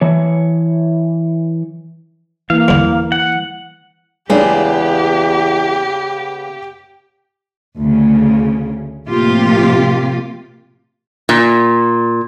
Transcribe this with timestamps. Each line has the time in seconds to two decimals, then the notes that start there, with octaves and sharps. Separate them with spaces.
0.01 E3 C#5
2.50 E3 A#3 F5
2.68 E2 D3
3.12 F#5
4.30 E2 C#3 G#3 A#3 B3 D4 G4
7.78 D2 C#3
9.08 A2 C3 F3 A#3 F4 G4
11.29 A#2